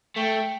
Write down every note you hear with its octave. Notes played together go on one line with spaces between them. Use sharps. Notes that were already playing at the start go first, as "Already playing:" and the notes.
A3 G5